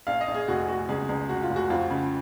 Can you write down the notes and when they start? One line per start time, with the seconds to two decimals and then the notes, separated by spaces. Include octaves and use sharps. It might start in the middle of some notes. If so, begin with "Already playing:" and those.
0.07 A#1 F5
0.21 D#5
0.28 A#1
0.34 G#4
0.48 F1 F#4
0.68 F1 F#4
0.89 C#2 G#4
1.09 C#2
1.29 F1 F#4
1.43 F4
1.50 F1
1.56 F#4
1.70 F2 F4
1.90 C#3